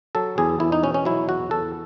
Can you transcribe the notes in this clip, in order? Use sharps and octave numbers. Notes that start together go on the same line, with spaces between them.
F#3 A4
E2 G#4
E2 E4
D#4
B2 C#4
C#4
F#3 E4
E2 F#4
E2 A4